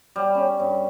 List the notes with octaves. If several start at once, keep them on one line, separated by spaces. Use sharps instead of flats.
G3
C#4
G2